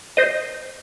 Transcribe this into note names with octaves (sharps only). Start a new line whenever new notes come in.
C5 D#5